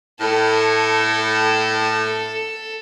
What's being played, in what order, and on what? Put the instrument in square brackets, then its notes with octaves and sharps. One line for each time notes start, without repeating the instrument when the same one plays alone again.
[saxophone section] A2 [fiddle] A4